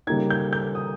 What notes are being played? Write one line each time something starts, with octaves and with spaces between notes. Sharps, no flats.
C#3 G3 A#3 D#4 G#6
G6
G6
D#6